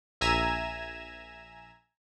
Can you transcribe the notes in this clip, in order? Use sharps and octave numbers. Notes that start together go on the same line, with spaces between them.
A#1 E5 G#5 A#5 G#6 E7